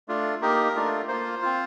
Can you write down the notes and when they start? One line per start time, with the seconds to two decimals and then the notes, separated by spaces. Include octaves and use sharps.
0.08 A3 D4 F4
0.41 A#3 D#4 G4 A#4
0.75 A3 D4 F4
1.08 A#3 F4 C5
1.42 C4 F4